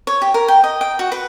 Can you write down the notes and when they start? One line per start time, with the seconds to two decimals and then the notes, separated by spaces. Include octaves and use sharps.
0.07 C#5
0.22 G4
0.34 A#4
0.48 G5
0.64 D#5
0.81 G5
0.99 F#4
1.12 B4